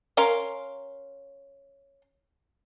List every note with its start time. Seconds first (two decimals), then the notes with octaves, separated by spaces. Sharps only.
0.17 C#4 A#4 F5 C6